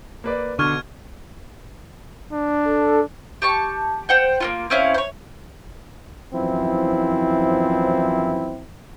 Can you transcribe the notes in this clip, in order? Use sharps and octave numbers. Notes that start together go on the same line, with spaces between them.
A#3 B4 D5
B2 D3 C#6 F6 G#6
D4
A4
G4 A5 C#6
C5 F#5 G5
A#3 C#4 F4
C4 C#4 E4 F5
C5 C#5
F#2 E3 F3 C4 E4